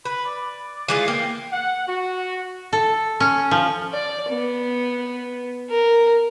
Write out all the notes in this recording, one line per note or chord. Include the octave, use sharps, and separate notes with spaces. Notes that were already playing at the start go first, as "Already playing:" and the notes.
B4 B5
D5
E3 G#3 F4 D5
A#3 G5
F#5
F#4
A4
C#4
F3
D5
B3
A#4